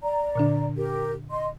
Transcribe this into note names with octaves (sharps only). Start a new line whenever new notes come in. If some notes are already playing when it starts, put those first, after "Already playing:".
D5 A#5
A#2 D3 D4
G4 A#4
D#5 C6